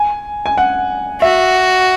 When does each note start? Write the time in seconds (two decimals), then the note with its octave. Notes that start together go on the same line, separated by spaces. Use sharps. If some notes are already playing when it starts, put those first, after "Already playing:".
Already playing: G#5
0.46 G#5
0.57 F#5
1.22 F#4 E5